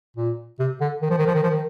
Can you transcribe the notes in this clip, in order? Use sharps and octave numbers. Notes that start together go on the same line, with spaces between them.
A#2
C3
D3
D#3
F3
D#3
F3
D#3
F3
D#3